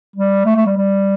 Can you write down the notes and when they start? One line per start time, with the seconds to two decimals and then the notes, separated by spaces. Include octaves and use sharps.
0.16 G3
0.45 A3
0.56 A3
0.66 G3
0.77 G3